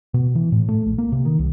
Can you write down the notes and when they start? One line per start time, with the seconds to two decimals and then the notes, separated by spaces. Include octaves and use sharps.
0.14 B2
0.35 E3
0.52 A2
0.69 A3
0.86 A#1
0.98 A#3
1.12 C3
1.25 D#3
1.39 C2